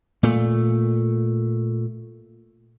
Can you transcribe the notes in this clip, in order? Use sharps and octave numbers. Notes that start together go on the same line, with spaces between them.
A#2 A3